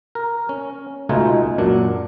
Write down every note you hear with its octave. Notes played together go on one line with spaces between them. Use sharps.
A#4
C#4
C#2 B2 A3 D#4 F4 G#5
F#2 A#2 F#3 D4